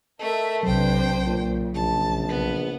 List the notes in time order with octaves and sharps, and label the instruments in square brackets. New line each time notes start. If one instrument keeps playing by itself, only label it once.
[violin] A3 E5 [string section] A#4 [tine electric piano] D#5
[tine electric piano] B1 F#3 [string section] C3 D4 B4 [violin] C5 G5
[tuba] A#2 [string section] C#3
[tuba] A#1 [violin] A5
[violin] B3